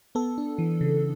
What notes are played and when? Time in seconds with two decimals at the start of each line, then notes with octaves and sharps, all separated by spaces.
0.15 B3 A4
0.38 D4
0.58 E3
0.81 C#3